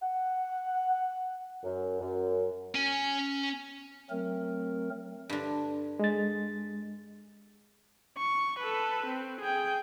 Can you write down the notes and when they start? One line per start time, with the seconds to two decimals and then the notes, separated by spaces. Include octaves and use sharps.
0.02 F#5
1.64 F#2
2.00 F#2
2.75 C#4 G#5
4.10 F#3 A3 C4 A#4
5.29 G2 D3
5.99 G#3 A6
8.18 C#6
8.59 A4 B4
9.06 C4
9.41 G#4 G5